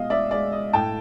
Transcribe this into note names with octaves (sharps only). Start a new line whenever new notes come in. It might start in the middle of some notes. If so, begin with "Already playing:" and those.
Already playing: B2 G#3 D#5 F5
D5 E5
G#3 D5
D#5
A2 G5 A5